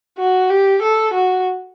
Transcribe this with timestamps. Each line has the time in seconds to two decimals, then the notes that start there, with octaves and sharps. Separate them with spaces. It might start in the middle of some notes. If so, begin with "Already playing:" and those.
0.18 F#4
0.50 G4
0.82 A4
1.14 F#4